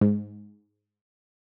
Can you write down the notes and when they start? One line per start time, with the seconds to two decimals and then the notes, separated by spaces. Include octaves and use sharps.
0.01 G#2